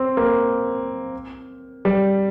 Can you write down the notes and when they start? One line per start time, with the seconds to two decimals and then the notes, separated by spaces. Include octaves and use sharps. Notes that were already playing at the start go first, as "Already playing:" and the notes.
Already playing: C4
0.17 A#3
1.85 G3